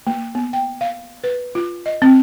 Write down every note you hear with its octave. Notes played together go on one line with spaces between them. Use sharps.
A#3
B3
G5
F5
B4
F4
D#5
C4